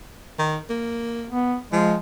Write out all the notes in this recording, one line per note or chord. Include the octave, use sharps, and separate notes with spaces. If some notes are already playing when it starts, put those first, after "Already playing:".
D#3
A#3
B3
F3 G#3